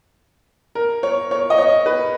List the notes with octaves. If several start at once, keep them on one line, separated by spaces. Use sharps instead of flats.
A#4
C#5
C#5
D#5
C#5
B4